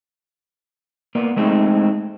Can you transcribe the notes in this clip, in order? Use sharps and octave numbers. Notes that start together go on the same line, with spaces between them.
A#3 B3 D5
G#3 A3 C4 D#4 G#4